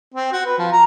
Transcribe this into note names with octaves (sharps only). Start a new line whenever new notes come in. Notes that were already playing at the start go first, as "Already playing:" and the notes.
C4
F#4
B4
F3
A#5